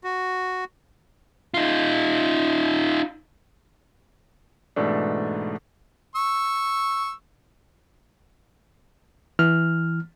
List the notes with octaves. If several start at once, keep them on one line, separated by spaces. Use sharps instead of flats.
F#4
D#4 F4
G#2 B2 E3 A3 D4
C#6 E6
E3 F6